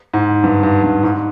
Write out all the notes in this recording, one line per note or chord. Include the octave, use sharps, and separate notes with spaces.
G#2
G2
G2
G2
G#2